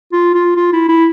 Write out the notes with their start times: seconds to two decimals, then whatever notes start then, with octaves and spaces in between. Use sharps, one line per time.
0.12 F4
0.34 F4
0.56 F4
0.73 E4
0.89 E4